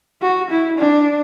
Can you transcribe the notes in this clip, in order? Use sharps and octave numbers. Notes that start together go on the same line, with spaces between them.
F#4
E4
D4